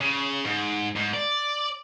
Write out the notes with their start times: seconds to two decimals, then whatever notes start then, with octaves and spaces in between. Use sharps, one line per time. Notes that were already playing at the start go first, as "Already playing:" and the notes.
0.01 C#3
0.45 G#2
0.96 G#2
1.14 D5